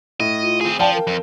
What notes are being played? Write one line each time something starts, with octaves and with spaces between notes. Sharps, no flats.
A2 D#5
F4
C4 G#4
F3 D5 F5 G5 A5
A#4
F2